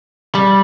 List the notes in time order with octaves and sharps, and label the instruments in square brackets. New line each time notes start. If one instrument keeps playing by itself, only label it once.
[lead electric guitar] G3